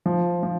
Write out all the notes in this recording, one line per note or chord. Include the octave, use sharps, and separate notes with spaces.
F3
F3